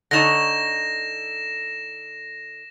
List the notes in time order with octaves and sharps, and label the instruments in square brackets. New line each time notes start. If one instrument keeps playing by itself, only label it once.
[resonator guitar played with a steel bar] D3 D#4 C#5 [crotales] A#6 E7